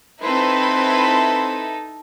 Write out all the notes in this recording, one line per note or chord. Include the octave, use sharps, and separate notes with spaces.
C4 D#4 E4 A4 B4 C5